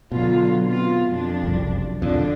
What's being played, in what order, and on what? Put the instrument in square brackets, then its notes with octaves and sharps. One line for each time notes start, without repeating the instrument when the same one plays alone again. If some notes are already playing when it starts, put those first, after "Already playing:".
[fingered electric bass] B2 [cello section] D3 F#3 F4
[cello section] C3 B3 F4
F2 F3 D4
[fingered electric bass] F#1 C2
[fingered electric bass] E1 F2 [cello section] D3 D4